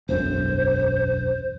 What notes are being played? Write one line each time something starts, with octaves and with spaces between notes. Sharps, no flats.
E1 B1 F#2 C5